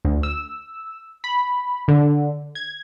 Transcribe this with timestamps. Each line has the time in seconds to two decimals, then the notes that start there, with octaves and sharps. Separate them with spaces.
0.05 D2
0.23 E6
1.24 B5
1.88 D3
2.55 G#6